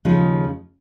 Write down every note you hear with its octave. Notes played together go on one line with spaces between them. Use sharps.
D#2 C#3 F3 G#3 D#4